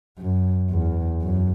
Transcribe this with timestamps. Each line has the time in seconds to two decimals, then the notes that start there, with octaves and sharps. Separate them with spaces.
0.18 F#2
0.70 E2
1.22 F#2